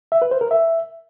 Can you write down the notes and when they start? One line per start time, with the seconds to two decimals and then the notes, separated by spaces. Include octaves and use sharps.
0.12 E5
0.22 B4
0.31 C5
0.41 A#4
0.51 E5